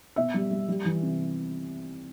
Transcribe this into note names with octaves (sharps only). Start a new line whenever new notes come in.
B2 E5
G3
G3
G3
E3
C3